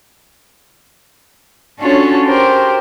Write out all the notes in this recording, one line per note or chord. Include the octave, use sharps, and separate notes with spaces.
C#4 D4 F4 F#4 A4 C#5
G4 A#4 C5